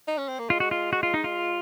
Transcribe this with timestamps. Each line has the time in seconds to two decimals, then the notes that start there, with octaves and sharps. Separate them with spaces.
0.07 D#4
0.18 C#4
0.28 C4
0.39 A#3
0.49 G#3 F4
0.60 F#4
0.71 F4
0.93 F#4
1.03 F4
1.14 D#4
1.24 F4